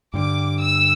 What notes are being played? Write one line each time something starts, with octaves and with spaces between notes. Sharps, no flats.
G2 D3 G3 D6
E6